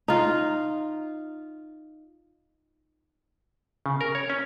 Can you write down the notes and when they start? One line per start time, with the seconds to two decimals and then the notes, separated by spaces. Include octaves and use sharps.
0.08 D#4 F4
3.86 C#3
4.01 A#4
4.15 C#5
4.30 C#4